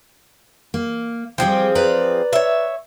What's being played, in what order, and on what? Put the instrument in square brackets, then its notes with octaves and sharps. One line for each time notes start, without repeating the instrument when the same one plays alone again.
[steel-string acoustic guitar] A#3
[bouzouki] F3 C4 G#4 [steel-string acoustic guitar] G3 G5
[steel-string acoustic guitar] B4 D5 A#5
[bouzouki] C#5 E5